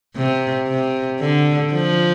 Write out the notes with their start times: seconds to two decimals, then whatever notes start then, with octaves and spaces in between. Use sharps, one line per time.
0.16 C3
0.68 C3
1.20 D3
1.73 F3